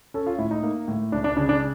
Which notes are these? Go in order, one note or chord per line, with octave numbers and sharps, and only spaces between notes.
C#4 A4
F4
A2 E4
D#4
A#3
A2
C#2 D4
D4
C#3 D4
D4